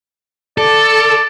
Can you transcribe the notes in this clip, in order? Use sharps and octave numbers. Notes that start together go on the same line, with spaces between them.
A4 D5